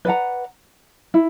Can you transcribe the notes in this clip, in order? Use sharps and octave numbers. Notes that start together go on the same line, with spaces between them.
B4 D5 F#5 A#5
E4